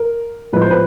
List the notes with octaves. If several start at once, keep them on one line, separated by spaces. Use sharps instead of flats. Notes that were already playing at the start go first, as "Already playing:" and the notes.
Already playing: A#4
A2 F3 G#3 B3 B4
C5
B4